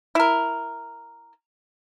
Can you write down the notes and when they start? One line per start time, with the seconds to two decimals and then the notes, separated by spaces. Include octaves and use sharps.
0.15 E4 A#4